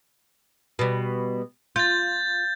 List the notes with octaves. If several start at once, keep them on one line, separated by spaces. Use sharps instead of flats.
B2 G3
F4 G6 A6